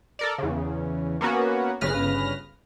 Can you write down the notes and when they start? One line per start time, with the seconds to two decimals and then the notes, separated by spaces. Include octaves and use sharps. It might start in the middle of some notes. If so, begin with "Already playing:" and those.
0.19 A4 A#4 D5
0.38 E2 C#3
1.21 A#3 B3 C#4 F#4
1.81 G1 C#3 B4 F6 A#6